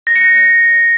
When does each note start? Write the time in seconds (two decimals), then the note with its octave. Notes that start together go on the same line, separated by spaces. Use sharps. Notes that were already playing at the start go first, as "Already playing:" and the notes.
0.07 A#6
0.16 C#7
0.24 A#6